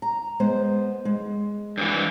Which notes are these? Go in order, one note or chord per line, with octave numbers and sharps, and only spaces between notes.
A#5
G#3 B3 C5
G#3
G2 E3